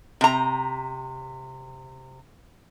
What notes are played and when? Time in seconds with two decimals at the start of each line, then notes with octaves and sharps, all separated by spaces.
0.21 C3 A#5